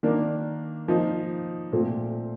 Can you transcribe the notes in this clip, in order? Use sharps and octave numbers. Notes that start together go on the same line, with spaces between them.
D#3 A#3 D4
F3 A#3 D#4
A#2 A3 C4 F4